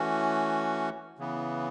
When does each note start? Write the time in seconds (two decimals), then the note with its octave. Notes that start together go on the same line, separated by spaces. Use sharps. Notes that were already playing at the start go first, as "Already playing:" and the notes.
Already playing: E3 A3 C#4 F#4
1.19 C#3 E3 B3